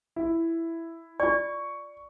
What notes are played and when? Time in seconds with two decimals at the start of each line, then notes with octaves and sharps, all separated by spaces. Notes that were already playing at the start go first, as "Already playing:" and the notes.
0.16 E4
1.20 F4 D5 C#6